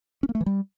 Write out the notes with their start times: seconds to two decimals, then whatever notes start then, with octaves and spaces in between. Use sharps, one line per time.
0.23 C#4
0.29 A#3
0.35 A3
0.41 E3
0.46 G3